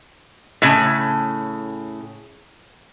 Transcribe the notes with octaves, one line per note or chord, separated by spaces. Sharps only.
A2 C#3